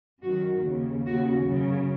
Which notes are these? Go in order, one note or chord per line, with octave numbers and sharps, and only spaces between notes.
F#2 D#3 F#4
D#2 C#3
D#2 C#3 F#4
F#2 C#3